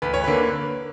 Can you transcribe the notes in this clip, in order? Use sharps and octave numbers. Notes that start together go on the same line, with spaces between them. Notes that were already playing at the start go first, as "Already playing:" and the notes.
D2 B4
C#5
D3 A#3 B4